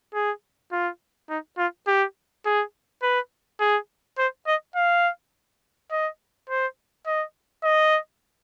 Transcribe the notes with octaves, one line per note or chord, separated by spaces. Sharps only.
G#4
F4
D#4
F4
G4
G#4
B4
G#4
C5
D#5
F5
D#5
C5
D#5
D#5